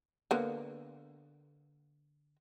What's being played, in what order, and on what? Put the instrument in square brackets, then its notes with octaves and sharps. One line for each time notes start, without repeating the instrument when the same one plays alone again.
[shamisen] D3 A#3 B3